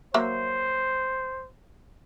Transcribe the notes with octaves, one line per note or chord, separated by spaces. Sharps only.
F#3 A#3 C5 E5